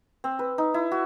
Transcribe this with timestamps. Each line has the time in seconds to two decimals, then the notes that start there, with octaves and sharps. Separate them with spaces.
0.24 C4
0.39 B4
0.58 D#4
0.74 E4
0.92 F#4